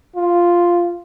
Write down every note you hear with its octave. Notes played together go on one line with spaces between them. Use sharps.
F4